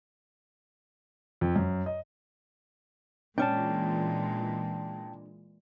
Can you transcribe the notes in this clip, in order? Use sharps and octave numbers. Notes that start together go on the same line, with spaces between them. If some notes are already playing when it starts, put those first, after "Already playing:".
F2
F#2
D#5
A#2 E3 G#3 C#4 D4 G5 A5